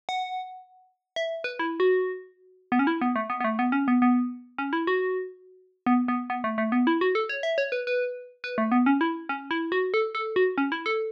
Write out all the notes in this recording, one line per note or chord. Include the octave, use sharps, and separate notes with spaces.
F#5
E5
B4
E4
F#4
B3
C#4
E4
B3
A3
B3
B3
A3
B3
C#4
B3
B3
C#4
E4
F#4
B3
B3
B3
A3
A3
B3
E4
F#4
A4
C#5
E5
C#5
B4
B4
B4
A3
B3
C#4
E4
C#4
E4
F#4
A4
A4
F#4
C#4
E4
A4